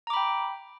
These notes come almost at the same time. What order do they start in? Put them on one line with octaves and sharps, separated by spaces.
A#5 D6 B5 G5